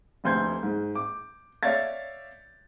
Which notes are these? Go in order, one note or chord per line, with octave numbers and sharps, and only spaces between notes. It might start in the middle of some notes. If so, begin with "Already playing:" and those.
F1 D2 C6 G6 G#6
G#2
D6
C#5 D5 E5 F5 G#6 A6